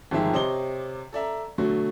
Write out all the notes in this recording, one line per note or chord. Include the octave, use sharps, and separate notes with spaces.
G1 F2 D#3 G#3 E5 G5
C3 C5 C#5 D#5 D6 G7
A4 D5 E5 A#5
B2 D3 F#3 A3 F#4